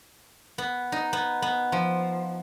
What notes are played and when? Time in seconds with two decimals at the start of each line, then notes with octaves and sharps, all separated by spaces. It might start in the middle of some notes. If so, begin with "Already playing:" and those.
0.58 B3
0.92 D#4
1.13 B3
1.42 B3
1.72 F3